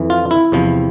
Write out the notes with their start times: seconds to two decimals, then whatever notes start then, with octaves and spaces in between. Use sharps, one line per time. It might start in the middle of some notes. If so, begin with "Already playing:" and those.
Already playing: F2 E3
0.10 F4
0.31 E4
0.52 E2 C3 F3